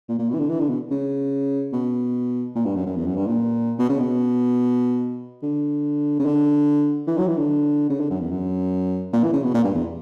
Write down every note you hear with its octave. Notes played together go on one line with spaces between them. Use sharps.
A#2
A#2
B2
E3
D3
E3
D3
B2
C#3
B2
A#2
G2
F#2
F#2
E2
F#2
G2
A#2
B2
C#3
B2
D3
C#3
D3
E3
F#3
E3
D3
C#3
D3
F#2
E2
F#2
A#2
E3
C#3
B2
A#2
G2
E2